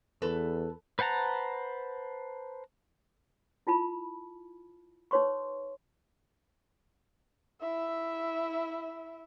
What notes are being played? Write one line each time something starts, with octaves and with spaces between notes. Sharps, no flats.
E2 A4 B4
B4 C5 F#5 A5 A#5
E4 F4 A5 B5
D#4 B4 C#5 C6 C#6
E4 E5